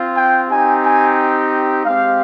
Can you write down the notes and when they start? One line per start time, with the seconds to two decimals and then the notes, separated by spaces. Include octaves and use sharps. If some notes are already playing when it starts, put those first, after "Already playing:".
Already playing: C4 F4
0.16 G5
0.49 C4 D#4 G4 G#5
0.83 G#5
1.85 G#3 C4 G4 F5